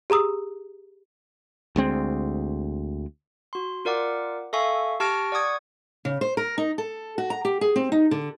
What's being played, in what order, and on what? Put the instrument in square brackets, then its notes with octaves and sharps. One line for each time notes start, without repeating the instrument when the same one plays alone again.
[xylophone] G4 G#4 A#5 D#6 E6
[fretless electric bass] D2 G#3 C4
[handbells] F#4 C6
F4 A#4 D5 F#5 D6
A4 E5 F5 G#5 C#6
G4 A5 C#6 F6 A#6 D7
D5 F#5 C#6 D#6 G#6
[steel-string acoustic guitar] C#3
C5
A#4
D#4
A4
F#4
A#5
G4
G#4
C4
D#4
D3